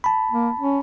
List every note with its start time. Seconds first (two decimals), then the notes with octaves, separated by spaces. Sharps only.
0.04 A5 B5
0.31 A#3
0.60 C#4